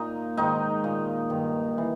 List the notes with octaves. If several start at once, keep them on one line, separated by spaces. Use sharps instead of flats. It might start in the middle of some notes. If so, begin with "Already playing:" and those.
Already playing: A#2 D#4
G#2 D#3 D#4
A#2
G2 D#3
E3